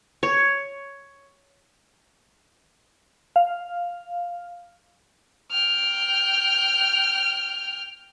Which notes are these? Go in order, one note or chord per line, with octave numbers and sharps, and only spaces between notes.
C#5
F5
G5 F6